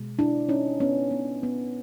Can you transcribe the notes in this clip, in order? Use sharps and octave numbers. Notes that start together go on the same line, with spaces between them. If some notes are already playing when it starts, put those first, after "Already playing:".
Already playing: B2 G#3
D4 E4
C#4 D#4
B3 C#4
B3
B3